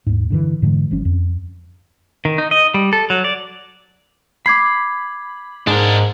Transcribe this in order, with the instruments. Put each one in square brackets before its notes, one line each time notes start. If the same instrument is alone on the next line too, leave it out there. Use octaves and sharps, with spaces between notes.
[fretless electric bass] D#2 G#2
G2 D3 E3
G#2 D3 E3 G#3
G1 F3 C#4
F2
[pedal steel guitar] D#3
D#4
D#5
G3
A4
F#3
D5
[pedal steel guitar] B5 [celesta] D6 G#6 C7
[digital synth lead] G#2 [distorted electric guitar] D4 A#4